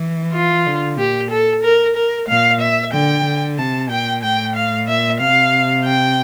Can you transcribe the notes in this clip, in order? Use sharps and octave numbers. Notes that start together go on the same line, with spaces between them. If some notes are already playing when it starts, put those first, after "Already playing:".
Already playing: E3
F4
D3
A#2 G4
A4
A#4
A#4
A#2 F5
E5
D3 G5
D3
C3 A5
A#2 G5
A2 G5
F5
A#2 E5
C3 F5
G5